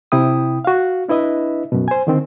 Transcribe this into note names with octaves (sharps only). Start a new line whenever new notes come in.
C3 E4 G5 D#6
F#4 F5
D4 E4 B4 D#5 E5
F#2 B2
C5 G#5
D3 D#3 C4